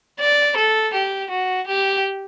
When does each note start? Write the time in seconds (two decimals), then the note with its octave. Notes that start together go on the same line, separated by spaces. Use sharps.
0.20 D5
0.57 A4
0.94 G4
1.30 F#4
1.67 G4